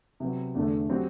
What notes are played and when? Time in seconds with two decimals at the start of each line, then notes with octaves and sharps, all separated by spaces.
0.20 C3 F#3 B3
0.55 E2 D3 A3
0.89 F#3 C4 G4